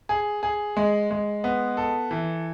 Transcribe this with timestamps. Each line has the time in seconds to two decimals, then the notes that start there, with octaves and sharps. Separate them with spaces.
0.09 G#4
0.43 G#4
0.77 G#3
1.11 G#3
1.44 B3
1.77 A4
2.11 E3